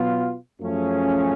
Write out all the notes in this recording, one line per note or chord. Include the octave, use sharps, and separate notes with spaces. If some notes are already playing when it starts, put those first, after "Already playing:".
Already playing: B2 F#3 B3 F4
F#2 F3 A3 C#4 G#4